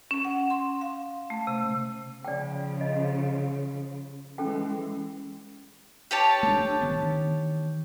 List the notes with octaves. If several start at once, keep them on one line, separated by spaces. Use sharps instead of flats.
C#4
F#5
C6
F5
A3
C3
C#3 F3 D5 G5
D#5
E3 G#3 C#4 A4 G5
G4 C#5 A5
A3 D4
D#3 E3 B3